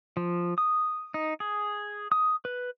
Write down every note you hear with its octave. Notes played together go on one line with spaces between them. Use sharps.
F3
D#6
D#4
G#4
D#6
B4